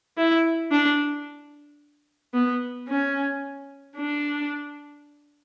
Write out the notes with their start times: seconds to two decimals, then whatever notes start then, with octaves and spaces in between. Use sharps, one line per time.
0.17 E4
0.72 D4
2.34 B3
2.89 C#4
3.97 D4